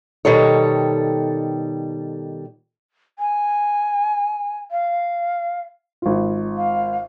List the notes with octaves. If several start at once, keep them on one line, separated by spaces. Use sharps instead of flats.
B2 D#3 G3 A4 C#5
G#5
F5
G#1 F4
F5